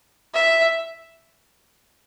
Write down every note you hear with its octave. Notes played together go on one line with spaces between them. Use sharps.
E5